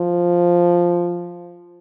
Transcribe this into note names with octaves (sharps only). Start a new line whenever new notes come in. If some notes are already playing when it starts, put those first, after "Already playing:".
Already playing: F3